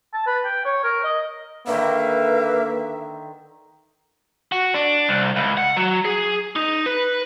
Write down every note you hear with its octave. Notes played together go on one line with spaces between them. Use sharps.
A5
B4
G5
C#5
A#4
D#5
D3 D#3 A#3 B4 E5 G5
F#4
D4
C2
C#2
F#5
F#3
G#4
D#4
B4